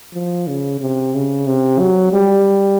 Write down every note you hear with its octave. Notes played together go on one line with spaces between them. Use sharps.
F3
C#3
C3
C#3
C3
F#3
G3